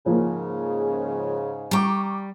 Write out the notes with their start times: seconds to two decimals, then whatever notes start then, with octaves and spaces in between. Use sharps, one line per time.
0.06 G#2 C#3 F3 A#3
1.71 G3 G5 A#5 C#6 D6